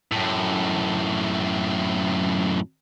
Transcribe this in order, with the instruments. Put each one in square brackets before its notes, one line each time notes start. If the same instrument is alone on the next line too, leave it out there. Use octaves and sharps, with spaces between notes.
[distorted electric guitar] F#2 A2